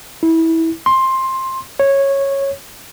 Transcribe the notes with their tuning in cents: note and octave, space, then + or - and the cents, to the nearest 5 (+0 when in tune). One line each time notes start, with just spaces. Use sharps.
E4 -20
C6 +15
C#5 -10